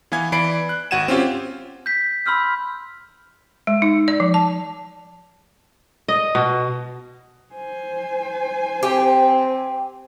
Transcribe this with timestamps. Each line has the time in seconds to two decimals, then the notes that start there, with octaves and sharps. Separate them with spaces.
0.12 E3 B3 F5 G#5 G#6
0.32 E3 D5 B5 C7 D7
0.69 F#6
0.91 G#1 F#4 F#5 G#6 D#7 E7
1.08 C4 C#4 F4 G4
1.86 G6 B6
2.26 B5 C6 E6 F6 G6
3.67 G#3
3.82 D#4
4.08 D5
4.20 F3
4.34 A5
6.08 D#5
6.35 B2
7.54 C5 G#5
8.83 C4 G4